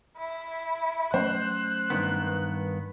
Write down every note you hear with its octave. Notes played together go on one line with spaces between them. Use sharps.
E4
F#3 A3 C#4 C5 F#6
G2 D#3 B3